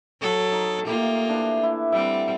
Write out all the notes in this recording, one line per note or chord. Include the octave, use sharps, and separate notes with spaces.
F#3 A4
D#4
A3 A#3 F4 G4
E3 D4
E4
G3 C4 E5 F#5